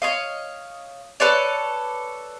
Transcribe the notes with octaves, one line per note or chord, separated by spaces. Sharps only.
C#5 D#5 F5
A4 B4 C#5 D5